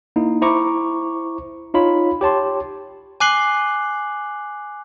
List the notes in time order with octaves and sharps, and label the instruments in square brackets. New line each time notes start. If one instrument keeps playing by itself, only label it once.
[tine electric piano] A#3 D#4 E4
E4 C5 A#5 C#6 D6
D#4 F4 C#5 B5
G4 C#5 A5 C6
[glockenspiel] G#5 D6 F#6 C7 F#7 G7